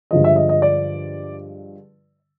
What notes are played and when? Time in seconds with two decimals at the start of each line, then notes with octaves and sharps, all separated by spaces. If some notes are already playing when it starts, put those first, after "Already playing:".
0.11 G2 D3 F3 G#3 D#5
0.24 E5
0.36 D#5
0.49 D#5
0.62 D5